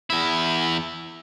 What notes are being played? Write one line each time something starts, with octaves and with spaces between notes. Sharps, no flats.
E2 E4